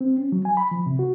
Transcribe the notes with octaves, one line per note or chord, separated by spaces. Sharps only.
C4
C#4
F#3
G#5
B5
F3
C3
F#4